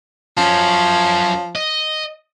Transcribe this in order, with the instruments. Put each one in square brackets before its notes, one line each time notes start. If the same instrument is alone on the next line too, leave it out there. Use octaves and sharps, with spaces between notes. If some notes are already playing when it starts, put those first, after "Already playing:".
[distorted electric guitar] F#2 C#4 [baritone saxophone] F3
[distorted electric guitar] D#5